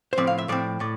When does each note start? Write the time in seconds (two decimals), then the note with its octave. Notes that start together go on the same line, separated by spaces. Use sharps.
0.13 C5
0.18 A2 F3 C4 D5
0.27 F5
0.38 E5
0.48 A2 F3 C4 D5
0.80 A2 D5